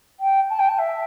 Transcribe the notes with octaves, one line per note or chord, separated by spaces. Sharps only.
G5
A5
G5
A5
E5